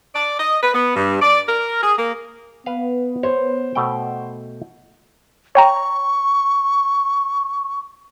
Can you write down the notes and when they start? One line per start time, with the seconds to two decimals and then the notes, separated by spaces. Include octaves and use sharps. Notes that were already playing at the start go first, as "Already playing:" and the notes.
0.15 D5
0.39 D#5
0.62 B4
0.74 B3
0.96 G2
1.21 D5
1.48 A#4
1.83 G#4
1.98 A#3
2.66 B3 B4 F5
3.23 C5 C#5
3.75 B2 A3 G5
5.55 C#5 G5 A#5 C#6